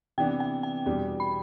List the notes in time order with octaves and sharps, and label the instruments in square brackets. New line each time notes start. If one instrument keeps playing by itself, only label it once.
[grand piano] C3 E3 B3 D4 [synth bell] G5
[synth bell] G5
G5
[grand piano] E2 B2 G3 D4
[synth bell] B5